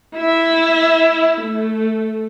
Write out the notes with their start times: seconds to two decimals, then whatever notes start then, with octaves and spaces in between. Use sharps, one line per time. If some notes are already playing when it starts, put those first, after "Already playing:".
0.16 E4 E5
1.42 A3